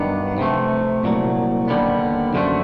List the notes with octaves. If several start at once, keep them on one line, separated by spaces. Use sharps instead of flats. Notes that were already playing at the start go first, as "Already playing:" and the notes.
Already playing: G2 D#3 F#3 B3 D4
C3 F3 A3
C2 A#2 F#3
D#2 D3 G3 B3
F#2 D3 F3 A3